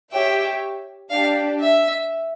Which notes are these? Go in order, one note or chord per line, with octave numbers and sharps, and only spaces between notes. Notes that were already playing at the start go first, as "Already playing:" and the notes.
G4 C#5 E5 G5
D4 G4 D5 F5
E5